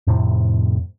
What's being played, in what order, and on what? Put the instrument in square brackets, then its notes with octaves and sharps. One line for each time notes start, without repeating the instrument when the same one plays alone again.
[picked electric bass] F2 A2 C3